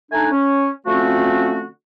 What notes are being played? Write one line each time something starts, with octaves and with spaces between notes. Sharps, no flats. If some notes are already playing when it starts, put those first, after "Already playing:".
A3 D4 D#4 G#5
C#4
D3 F3 A3 C4 C#4 F#4